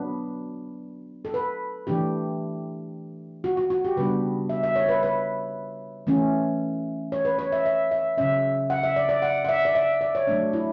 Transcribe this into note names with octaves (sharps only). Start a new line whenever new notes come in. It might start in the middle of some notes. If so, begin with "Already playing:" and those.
Already playing: F#3 B3 D4 B4
A4
B4
E3 A3 D4 G4
F#4
F#4
F#4
G4
C#3 G3 B3 D4 B4
E5
E5
C#5
B4
B4
E3 A3 C#4
C#5
B4
C#5
E5
E5
E5
C#3 F#3 C#4 E5
F#5
E5
D5
D5
F#5
F#5
E5
D5
E5
D5
C#5
F#3 A3 D4
E4